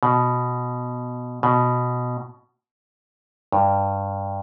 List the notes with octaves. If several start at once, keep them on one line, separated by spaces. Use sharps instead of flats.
B2
B2
G2